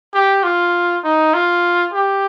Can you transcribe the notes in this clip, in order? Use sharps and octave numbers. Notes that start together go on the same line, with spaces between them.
G4
F4
D#4
F4
G4